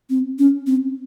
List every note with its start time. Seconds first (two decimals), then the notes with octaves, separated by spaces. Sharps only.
0.10 C4
0.39 C#4
0.67 C4